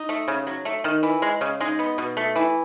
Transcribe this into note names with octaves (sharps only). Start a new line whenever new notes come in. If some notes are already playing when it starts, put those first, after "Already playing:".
Already playing: D#4
A3
C#3
F#3
A3
D#3
E3
G#3
C#3
G#3 D#4
B3
B2
A3
E3